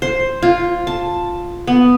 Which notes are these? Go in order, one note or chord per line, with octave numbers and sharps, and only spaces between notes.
C5
F4
A5
B3